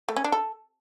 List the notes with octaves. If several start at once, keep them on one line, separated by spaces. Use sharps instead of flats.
A3
C#4
D4
A4